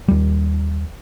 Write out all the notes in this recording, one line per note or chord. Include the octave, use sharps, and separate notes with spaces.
D#2 G3